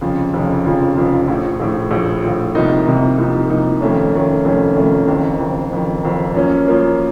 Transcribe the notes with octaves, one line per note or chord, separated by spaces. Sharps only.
F1 F2 C#3 F3
F1 F2 C#3 F3
F1 F2 C#3 F3
F1 F2 C#3 F3
A#1 A2 F3
A#1 A2 F3
A#1 A2 F3
A#1 A2 F3
C2 C3 F3 A#3 D#4
C2 C3 F3 A#3 D#4
C2 C3 F3 A#3 D#4
C2 C3 F3 A#3 D#4
F1 F2 D#3 A3 C#4
F1 F2 D#3 A3 C#4
F1 F2 D#3 A3 C#4
F1 F2 D#3 A3 C#4
F#1 F2 D#3
F#1 F2 D#3
F#1 F2 D#3
F#1 F2 D#3
F#2 F3 A#3 C#4
F#2 F3 A#3 C#4